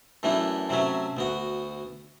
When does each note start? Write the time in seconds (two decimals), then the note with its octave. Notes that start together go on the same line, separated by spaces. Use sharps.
0.23 F#2 E3 A3 B3 D4 E4
0.69 C3 F#3 A3 C#4 E5
1.17 D2 B3 F#4